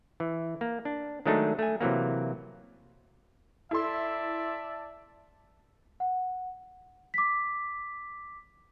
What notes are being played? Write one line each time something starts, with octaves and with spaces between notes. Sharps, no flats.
E3
A#3
D4
D#3 F#3 G#3 A3 D4 D#4
A3 G#5
C3 E3 F#3 A#3
E4 A4 D5 E5 A5 C6
F#5
D6 B6